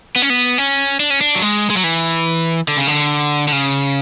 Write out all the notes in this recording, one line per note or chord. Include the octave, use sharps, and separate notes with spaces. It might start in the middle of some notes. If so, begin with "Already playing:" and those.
B3
C#4
B3
C#4
D4
C#4
D4
F#3
G#3
G#3
F#3
E3
D3
C#3
D3
D3
C#3